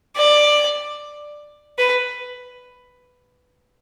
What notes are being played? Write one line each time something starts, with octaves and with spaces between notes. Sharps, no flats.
D5
B4